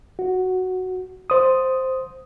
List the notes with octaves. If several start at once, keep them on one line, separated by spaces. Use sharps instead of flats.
F#4
C5 D#6